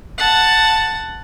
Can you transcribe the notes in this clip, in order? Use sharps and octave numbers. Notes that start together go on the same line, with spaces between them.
F#5 A5